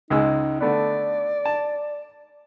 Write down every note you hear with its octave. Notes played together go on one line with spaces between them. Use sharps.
C#2 G#3 D#4 E6
D3 A3 B3 D5
A5